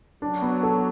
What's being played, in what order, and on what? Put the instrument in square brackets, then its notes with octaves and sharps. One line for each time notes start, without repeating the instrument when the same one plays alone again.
[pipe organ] F#3 [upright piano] D4
[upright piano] B3
A4